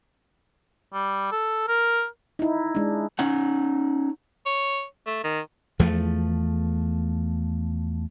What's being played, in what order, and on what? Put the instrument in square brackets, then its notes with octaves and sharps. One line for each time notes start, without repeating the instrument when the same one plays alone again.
[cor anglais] G3
A4
A#4
[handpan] D#4 E4
G#3 D4
[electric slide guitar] C#4 D#4 F#5
[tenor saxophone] C#5
A3
D#3
[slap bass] E2 F3 A3